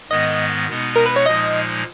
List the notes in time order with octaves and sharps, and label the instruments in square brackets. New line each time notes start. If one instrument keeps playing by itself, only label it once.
[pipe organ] G#2 D#3 G#3 B3 [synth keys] D#5
[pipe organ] B2 G#3 B3 D#4
[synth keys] A#4
B4
C#5
[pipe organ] A#2 F3 G#3 D#4 [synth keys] D#5